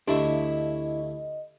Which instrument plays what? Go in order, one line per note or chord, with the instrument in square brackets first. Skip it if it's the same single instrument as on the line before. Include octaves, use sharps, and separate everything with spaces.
[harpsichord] D2 A3 C#5 [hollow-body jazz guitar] D4 E4 [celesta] G4 [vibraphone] D#5